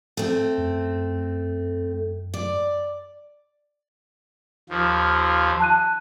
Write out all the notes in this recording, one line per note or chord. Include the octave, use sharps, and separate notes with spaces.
A3 C4
F#2
D5
D#2 F3
A5 F#6 D#7